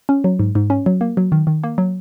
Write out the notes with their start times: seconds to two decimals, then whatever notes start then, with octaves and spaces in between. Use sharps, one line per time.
0.09 C#4
0.24 F#3
0.39 G#2
0.55 G#2
0.70 C#4
0.86 F#3
1.01 A#3
1.17 F#3
1.32 D#3
1.47 D#3
1.64 A#3
1.78 F#3